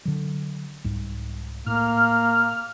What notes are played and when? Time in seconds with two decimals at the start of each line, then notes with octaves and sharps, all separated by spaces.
0.05 D3 F#3
0.84 C2 G#2
1.66 A2 A#3 F6